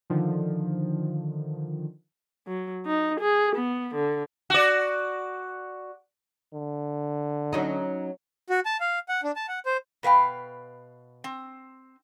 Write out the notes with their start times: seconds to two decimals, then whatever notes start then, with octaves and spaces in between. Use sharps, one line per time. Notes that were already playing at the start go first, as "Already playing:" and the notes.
0.10 D3 D#3 F3
2.47 F#3
2.86 D#4
3.20 G#4
3.56 B3
3.95 D3
4.50 F#4 D5
6.54 D3
7.53 F#3 C#4 D#4
8.50 F#4
8.65 A5
8.80 F5
9.09 F#5
9.23 D4
9.36 A5
9.48 F#5
9.66 C5
10.03 B2 B4 F5 G5
11.24 C4